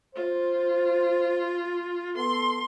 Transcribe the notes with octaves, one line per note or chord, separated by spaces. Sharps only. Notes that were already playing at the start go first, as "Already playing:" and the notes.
F4 C5
B3 A4 C6